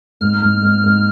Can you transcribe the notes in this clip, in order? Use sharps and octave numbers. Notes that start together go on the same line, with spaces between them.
G#2 F6
G#2
G#2
G#2